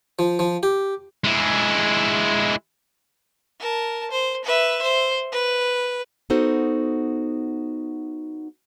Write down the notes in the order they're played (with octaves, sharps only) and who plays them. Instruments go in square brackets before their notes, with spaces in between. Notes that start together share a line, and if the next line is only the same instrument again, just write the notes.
[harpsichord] F3
F3
G4
[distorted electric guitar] G#3 E4
[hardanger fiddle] A#4 A5
C5
B4 E5
C5
B4
[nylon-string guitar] B3 D#4 F#4 A4 C5